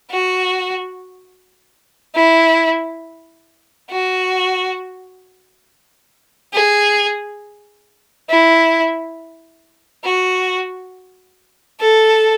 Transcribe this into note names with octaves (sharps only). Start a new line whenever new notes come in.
F#4
E4
F#4
G#4
E4
F#4
A4